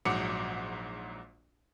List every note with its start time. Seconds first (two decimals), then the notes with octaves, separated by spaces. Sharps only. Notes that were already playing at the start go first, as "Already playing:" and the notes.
0.05 A#1 G#2 F#3 F#5 D6 C#7